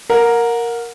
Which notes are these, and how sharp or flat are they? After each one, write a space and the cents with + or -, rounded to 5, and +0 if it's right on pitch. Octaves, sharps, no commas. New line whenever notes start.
A#4 +0 F#5 -30